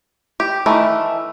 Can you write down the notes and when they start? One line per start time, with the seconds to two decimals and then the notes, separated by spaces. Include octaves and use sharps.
0.40 G4
0.66 D#3 E3 A3